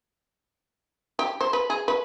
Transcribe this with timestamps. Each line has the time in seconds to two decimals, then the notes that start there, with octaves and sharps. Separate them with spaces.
1.19 G4
1.41 C5
1.53 B4
1.70 G#4
1.88 B4